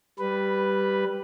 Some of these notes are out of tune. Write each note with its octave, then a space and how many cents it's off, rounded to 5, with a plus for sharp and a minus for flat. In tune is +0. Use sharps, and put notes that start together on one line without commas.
G3 -5 B4 +0